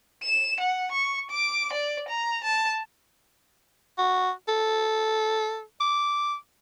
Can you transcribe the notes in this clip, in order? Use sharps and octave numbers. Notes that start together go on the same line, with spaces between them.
E7
F#5
C#6
D6
D5
A#5
A5
F#4
A4
D6